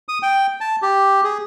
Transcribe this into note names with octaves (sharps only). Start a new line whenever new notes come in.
D#6
G5
A5
G4
G#4